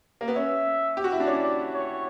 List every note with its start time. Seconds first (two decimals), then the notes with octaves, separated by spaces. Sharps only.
0.21 A#3
0.28 B3
0.36 C#4 E5
0.97 G4
1.04 F#4
1.12 E4
1.20 D4
1.27 C#4 D5
1.73 C#5